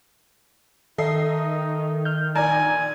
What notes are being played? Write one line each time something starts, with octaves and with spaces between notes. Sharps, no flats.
D#3 D#4 A4 D#5 E5 C7
F6 G6
A#1 D5 G#5 A#5